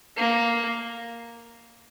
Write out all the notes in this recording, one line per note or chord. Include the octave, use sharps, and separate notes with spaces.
A#3